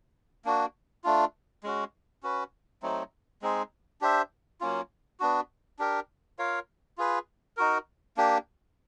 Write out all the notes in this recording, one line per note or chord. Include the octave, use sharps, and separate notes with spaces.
A#3 D4 F#4
A3 D4 F4
G#3 C#4 F#4
C#4 F#4 B4
F#3 A3 C4 D#4
G#3 C4 D#4 G#4
D4 G4 C5 E5
F#3 A#3 C#4 F4
B3 D4 F#4
D4 G4 A#4
F4 A#4 C#5 F5
F4 G#4 B4
D#4 F#4 A#4
A#3 D4 G4